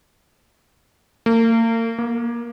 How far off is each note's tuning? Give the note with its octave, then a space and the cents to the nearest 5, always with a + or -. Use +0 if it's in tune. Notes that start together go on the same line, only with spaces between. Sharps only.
A#3 -40
A#3 +20